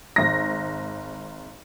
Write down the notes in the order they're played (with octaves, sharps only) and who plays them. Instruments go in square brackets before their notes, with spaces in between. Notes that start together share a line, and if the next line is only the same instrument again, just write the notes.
[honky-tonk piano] G#1 A#6